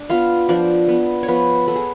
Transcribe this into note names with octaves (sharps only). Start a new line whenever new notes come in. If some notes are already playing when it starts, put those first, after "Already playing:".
Already playing: D4 D5
B3 F4 F5
F3 D4 D5
B3
C#5
F3 B3 B4
B3 A4
G#4